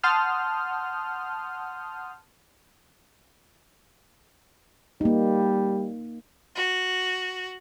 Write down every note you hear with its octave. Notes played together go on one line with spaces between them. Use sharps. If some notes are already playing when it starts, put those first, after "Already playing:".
F#5 A5 C6 D#6 F6 G6
G3 A#3 D#4
F#4